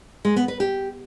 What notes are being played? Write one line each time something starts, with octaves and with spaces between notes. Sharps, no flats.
G#3
B3
B4
G4